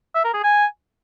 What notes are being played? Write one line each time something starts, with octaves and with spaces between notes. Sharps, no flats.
E5
A#4
G#4
G#5